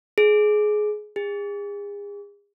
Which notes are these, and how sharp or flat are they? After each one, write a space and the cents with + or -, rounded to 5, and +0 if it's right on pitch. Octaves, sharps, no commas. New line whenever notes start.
G#4 +20
G#4 -35